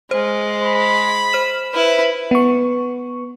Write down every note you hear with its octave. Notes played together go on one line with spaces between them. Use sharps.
G#3 C5
B5
C5 F6 E7
E4 B4
B3 C#6